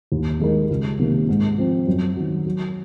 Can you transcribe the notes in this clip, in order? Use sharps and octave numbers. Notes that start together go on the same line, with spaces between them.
D#2
D#3 G#3 D#4 A#4
C#2
C3 D#3 A#3
G#2
F3 C4
F#2
D#3 F#3
F#3